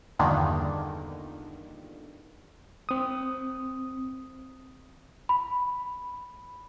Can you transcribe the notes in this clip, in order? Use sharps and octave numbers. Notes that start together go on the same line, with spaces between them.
E2 G2 A#2 D3 D#3
C4 D#6
B5